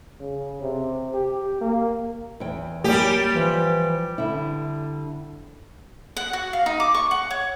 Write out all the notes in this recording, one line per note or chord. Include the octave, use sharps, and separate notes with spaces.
C#3
C3
G4
A#3
E2 G5
F#2 G3 A#3 G4 G#5
E3 F3 B4
D3 E4
F#5
F#4
F5
D#4
D6
C#6
F#5
C#5